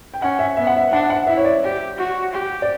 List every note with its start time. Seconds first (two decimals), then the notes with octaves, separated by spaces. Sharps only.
0.14 G5
0.21 C#4 F#5
0.39 E5
0.57 B3 E5
0.67 F#5
0.77 E5
0.92 D4 F#5
1.01 E5
1.10 F#5
1.27 E4 E5
1.37 C#5
1.45 D5
1.63 G4
1.98 F#4
2.33 G4
2.62 D5